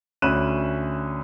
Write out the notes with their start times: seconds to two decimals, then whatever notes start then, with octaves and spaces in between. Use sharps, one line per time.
0.22 D2 C#4 B5 F#6 D#7 E7